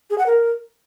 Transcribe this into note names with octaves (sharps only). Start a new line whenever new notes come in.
G#4
F#5
A#4